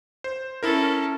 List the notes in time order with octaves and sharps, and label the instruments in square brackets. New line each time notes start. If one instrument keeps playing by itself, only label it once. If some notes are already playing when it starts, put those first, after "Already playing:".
[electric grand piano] C5
[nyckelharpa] C#4 A4 [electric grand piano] E4 A#4